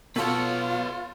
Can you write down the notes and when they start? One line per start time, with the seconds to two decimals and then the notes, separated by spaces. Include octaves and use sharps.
0.16 B2 F4 A4 B4 C#5 A5